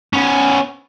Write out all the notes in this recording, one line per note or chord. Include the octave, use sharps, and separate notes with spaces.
B3 C#4